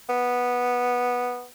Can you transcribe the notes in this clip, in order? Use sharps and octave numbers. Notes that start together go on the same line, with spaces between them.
B3